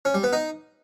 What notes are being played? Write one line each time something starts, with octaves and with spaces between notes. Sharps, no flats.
C#4
G3
B3
D#4